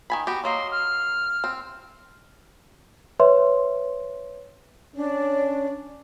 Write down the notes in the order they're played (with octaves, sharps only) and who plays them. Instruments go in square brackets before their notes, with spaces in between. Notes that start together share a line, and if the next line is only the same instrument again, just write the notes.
[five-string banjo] D#3 G#5 B5
B3 F#4 G4
[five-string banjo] F#3 A#3 D#5 [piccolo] C6
[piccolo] F6
[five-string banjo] C4
[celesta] B4 C#5 E5 C6
[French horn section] C#4 [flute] D4